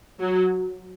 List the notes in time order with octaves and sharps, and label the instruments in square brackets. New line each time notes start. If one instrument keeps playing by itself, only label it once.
[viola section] F#3